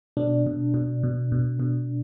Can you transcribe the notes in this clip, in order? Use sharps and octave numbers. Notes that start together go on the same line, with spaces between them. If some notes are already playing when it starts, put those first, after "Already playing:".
B2 D4
B2
B2
B2
B2
B2